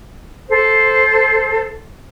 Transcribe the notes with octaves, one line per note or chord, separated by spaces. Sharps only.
A4 C5